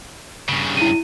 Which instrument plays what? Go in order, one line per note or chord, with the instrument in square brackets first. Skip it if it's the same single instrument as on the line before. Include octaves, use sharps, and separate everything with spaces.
[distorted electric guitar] G2 C#3
[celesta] E4 D#7